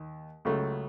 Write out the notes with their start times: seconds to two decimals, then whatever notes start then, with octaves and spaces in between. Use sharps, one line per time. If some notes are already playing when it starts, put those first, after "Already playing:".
Already playing: D#2
0.45 C#2 C#3 F#3 A3